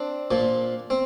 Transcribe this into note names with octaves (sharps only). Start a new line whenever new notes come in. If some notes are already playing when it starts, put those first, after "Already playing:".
Already playing: C4 D4
A#2 F3
C4